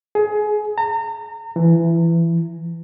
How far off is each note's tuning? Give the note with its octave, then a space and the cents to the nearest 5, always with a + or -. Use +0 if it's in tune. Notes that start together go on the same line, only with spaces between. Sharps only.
G#4 +25
A#5 -35
E3 +20